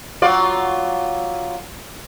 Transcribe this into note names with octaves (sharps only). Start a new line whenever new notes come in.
F#3 F4 D5